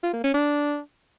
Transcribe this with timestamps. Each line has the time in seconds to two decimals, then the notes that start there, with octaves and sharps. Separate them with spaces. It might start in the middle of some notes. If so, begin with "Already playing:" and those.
0.03 F4
0.14 A#3
0.24 C#4
0.34 D4